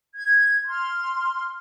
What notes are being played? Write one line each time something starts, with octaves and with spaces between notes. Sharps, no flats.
G#6
C6 F6